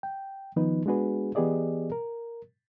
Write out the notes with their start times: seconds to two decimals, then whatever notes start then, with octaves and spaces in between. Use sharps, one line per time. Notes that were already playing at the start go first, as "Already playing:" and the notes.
0.03 G5
0.56 D#3 F3 B3 D#4 B4
0.86 G#3 B3 D4 F#4 G#4 B4
1.35 E3 B3 G4 G#4 D5 D#5
1.92 A#4